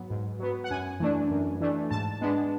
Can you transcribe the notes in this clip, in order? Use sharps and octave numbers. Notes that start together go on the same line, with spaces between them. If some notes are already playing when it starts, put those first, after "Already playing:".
Already playing: G#2 F#3 B3
G#2
F#3 B3
F#5
F#2 G#5
E3 A3 D4
F#2
E3 A3 D4
G#2 A5
G#3 B3 D4